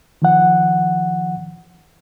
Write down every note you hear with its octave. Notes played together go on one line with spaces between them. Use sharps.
D#3 F3 F#5